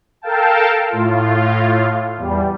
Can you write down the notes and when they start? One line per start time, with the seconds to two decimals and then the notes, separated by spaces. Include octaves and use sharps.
0.22 A4 A#4 F5 G5 A5
0.90 A2 F4
2.17 E2 G3